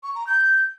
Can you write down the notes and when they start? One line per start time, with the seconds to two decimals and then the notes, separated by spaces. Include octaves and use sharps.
0.03 C#6
0.15 A#5
0.27 G6